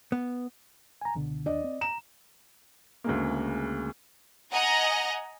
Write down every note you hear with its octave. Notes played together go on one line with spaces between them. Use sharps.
B3
G#5 A#5
C#2 B2 D3
D#2 D4 D5 D#5
C4
A#5 E7
D2 C#3 G#3 A#3
D#5 F#5 G#5 A#5